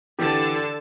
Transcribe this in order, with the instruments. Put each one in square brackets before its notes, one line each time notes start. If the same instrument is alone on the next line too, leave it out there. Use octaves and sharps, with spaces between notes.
[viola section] D3 A5 [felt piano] E3 G4